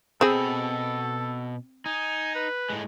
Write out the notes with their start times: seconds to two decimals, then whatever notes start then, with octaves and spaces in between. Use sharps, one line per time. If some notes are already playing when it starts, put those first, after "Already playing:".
0.21 B2 C4 G#4 A4 B5
1.86 D#4 G#5
2.35 B4
2.70 A2 G#3